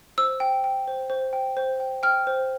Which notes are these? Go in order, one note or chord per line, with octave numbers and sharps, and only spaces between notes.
C5 E6
G5
G5
C5
C5
G5
C5
G5
G5 F6
C5